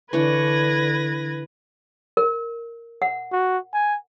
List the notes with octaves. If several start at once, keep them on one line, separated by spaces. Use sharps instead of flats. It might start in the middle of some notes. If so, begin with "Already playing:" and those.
D3 E3 D4 B4 C#5 G#6 A#6
A#4
F#5
F#4
G#5